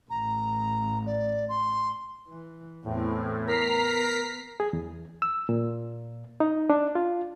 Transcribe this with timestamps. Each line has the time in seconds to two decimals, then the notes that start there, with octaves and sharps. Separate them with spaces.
0.10 A1 A#5
1.06 D5
1.49 C6
2.28 E3
2.85 E2 A2 C4
3.47 B3 A#4 A#5 B6 C7
4.60 G#4
4.73 E2
5.22 E6
5.49 A#2
6.40 D#4
6.70 D4
6.95 F4